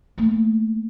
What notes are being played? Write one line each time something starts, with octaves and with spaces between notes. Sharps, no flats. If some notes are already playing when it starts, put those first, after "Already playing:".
A3 A#3